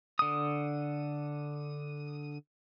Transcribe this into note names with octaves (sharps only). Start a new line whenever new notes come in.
D3 D#6